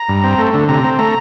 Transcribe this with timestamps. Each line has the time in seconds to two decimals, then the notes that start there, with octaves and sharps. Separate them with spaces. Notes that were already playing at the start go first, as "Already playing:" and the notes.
Already playing: A#5
0.09 G2
0.24 C4
0.39 A3
0.54 D3
0.69 C3 A#5
0.84 C4
0.99 A3 A#5